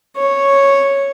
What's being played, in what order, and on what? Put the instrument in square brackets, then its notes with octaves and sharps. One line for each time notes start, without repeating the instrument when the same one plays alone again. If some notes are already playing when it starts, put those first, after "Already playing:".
[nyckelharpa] C#5